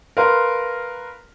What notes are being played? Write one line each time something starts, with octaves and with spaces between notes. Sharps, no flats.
A#4 B4 F5 C6